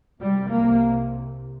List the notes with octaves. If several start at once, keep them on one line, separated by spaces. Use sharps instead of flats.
C2 C3 G3
A#3